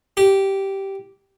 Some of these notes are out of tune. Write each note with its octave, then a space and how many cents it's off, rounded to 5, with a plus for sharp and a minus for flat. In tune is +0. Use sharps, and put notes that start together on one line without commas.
G4 -10